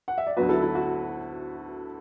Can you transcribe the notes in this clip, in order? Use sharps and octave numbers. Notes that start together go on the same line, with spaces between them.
F#5
E5
D5
D2 D3 F#3 B3 F#4 B4
E4 A4
E4
F#4